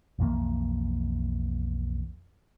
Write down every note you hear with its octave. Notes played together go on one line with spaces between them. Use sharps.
B1 F2 E3 A#3